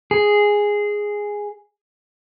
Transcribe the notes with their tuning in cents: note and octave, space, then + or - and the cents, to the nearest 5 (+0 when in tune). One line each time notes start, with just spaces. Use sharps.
G#4 -5